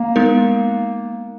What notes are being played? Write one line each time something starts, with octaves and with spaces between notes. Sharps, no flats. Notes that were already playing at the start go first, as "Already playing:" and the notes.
Already playing: A#3
G#3 B3 D#4 A#4